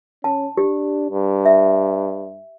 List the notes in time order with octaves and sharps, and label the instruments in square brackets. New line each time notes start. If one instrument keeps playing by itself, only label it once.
[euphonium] C#4 [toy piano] A5
[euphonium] D4 [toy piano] G4
[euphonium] G2
[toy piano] E5